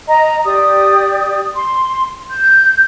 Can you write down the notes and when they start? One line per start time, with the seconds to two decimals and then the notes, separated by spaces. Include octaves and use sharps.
0.08 D#5 A#5
0.45 G4 D5 D#6
1.54 C6
2.31 G6